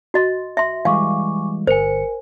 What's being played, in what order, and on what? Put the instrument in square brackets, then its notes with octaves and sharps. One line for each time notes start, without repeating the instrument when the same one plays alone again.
[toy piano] F#4 D#5 C6
E5 C6
[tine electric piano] E3 G3 G#3 [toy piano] F5 [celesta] G#5 C#6 D6
[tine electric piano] G1 C#7 [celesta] A#4 G#5 [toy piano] C5